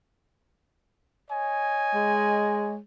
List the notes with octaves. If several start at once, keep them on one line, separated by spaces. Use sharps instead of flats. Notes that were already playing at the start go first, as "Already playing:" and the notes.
C#5 D#5 G#5
G#3